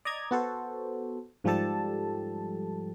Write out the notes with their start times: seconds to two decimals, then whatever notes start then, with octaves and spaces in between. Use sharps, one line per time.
0.05 D5 D#5 A#5 G#6
0.31 B3 F#4 A4 C5
1.44 G#2 F3 G3 G4 A4 A5